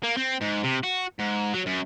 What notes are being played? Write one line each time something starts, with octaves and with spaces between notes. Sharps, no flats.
A#3
C4
G#2
C3
F#4
G#2
F#3
F#2